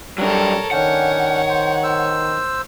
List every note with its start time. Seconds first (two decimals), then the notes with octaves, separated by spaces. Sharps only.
0.18 F#3 G3 D4 A4 A#4 C#5
0.71 D#3 C#4 D4 C#5 F#5 G5
1.49 C5
1.83 C5 E6